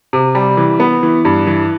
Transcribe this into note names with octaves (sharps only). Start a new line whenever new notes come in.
C3
G3
E3
B3
E3
G2
E3